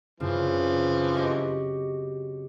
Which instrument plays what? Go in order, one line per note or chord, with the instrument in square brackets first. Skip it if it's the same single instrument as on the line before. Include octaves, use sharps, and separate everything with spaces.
[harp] F#2 C#3 C4 [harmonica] E3 F3
[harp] F#4 G4 D#5